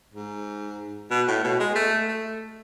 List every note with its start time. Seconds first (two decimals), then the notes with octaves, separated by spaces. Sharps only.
0.14 G#2
1.11 B2
1.28 A2
1.44 B2
1.60 G#3
1.75 A3
2.08 A3